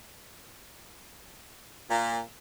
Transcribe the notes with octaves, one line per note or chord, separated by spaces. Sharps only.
A#2